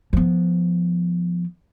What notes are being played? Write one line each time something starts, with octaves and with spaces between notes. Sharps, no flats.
F3 B3